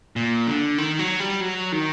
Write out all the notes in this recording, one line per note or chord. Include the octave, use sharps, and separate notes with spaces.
A#2
D3
D#3
F#3
G3
F#3
D#3